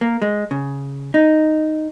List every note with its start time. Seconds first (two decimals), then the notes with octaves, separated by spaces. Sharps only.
0.01 A#3
0.22 G#3
0.51 C#3
1.14 D#4